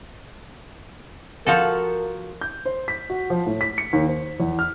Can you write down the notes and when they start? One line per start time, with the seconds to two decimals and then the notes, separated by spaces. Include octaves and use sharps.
1.47 F3 F#4 A4 A#4
2.41 G6
2.65 C5
2.88 B6
3.10 F#4
3.30 F3
3.46 A2
3.61 B6
3.78 C#7
3.93 D#2
4.08 C5
4.40 E2
4.59 F6